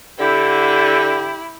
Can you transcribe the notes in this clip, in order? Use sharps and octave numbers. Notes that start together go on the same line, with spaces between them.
D3 E4 G4